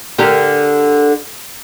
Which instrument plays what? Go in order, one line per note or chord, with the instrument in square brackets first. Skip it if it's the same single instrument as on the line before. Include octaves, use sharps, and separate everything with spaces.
[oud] D3 G4 A#4